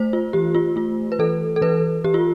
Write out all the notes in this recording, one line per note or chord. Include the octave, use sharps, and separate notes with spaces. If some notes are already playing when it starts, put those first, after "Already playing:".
Already playing: A3 C5
F4
E3 G4
F4
A3 F4
B4
E3 A4
A4
E3 B4
E3 G4
F4